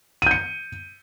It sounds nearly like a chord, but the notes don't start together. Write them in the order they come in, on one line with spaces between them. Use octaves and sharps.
D#7 G6 C#7